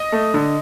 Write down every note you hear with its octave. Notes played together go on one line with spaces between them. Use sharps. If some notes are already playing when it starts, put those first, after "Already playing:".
Already playing: D#5
A3
D3